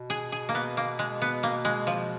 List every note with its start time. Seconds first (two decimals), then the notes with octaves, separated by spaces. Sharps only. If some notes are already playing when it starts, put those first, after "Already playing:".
Already playing: B2
0.10 G#4
0.32 G#4
0.49 A#3
0.55 B3
0.77 A#3
0.99 G#3
1.22 B3
1.43 A#3
1.65 G#3
1.87 F3